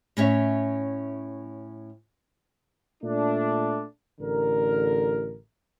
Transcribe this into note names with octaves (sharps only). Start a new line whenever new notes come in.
A2 C#4 C#5 E5
A#2 A3 D4
A1 D3 A#4